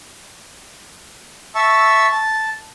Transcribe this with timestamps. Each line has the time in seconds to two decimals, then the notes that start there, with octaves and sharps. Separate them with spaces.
1.55 E5 A5 C#6 E6
2.12 A5